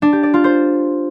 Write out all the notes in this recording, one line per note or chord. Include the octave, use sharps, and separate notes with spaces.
D4
G4
D5
F4
C5